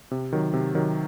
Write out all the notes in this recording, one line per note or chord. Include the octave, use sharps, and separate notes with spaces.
C3
D#3 F#3
C3
D#3 F#3